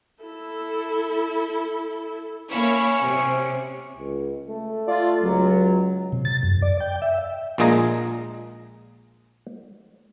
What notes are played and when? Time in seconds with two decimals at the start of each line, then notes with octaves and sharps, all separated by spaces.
0.23 E4 A4
2.51 A#3 C#4 E4 C#5
3.03 C3
3.96 C#2
4.48 A3
4.88 F4 D5
5.23 C#2 F#3
6.12 C3
6.25 A6
6.43 F#2
6.62 D5
6.80 G5
7.02 E5
7.58 A#1 A#2 G#3 G#4 A#5